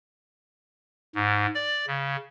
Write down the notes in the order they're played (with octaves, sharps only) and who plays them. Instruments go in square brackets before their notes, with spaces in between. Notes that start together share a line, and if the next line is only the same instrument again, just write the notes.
[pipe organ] G#2
D5
C#3